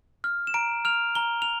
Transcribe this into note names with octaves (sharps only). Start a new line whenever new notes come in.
F6
E7
A#5 D7
F6 F7
A#5 G7
F7